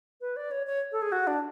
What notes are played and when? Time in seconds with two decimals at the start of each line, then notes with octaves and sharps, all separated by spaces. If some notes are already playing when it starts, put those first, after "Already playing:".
0.21 B4
0.36 D5
0.51 C#5
0.67 C#5
0.92 A4
1.02 G#4
1.12 F#4
1.27 D4